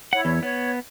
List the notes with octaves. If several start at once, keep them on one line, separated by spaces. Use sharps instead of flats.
E4 C#5 F#5
E2
B3 C#5